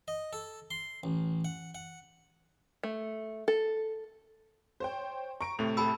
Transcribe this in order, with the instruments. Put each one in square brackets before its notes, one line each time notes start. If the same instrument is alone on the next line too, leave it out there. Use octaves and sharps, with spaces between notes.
[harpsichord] D#5
A4
C6
A1
F#5
F#5
[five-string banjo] A3
A4
[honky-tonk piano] C5 C#5 G5
[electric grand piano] A#5 [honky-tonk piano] C#6 D7
[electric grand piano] A2 C3 A3 [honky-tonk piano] F7
[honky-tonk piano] G4 A4 [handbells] A5 B5 E6